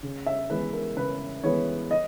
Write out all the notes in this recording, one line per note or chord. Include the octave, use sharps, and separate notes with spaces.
C#3
E5
E3 G#3 B3 B4
A#4
C#3 B4
E3 G#3 B3 C#5
D#5